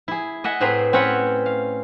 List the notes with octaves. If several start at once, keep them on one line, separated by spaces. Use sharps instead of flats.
E4 G#4
D#5 E5 F#5 G#5
A2 C4 G#4 B4 E5 A#5
C4 C#4 B4 C#5 F#5 B5
F5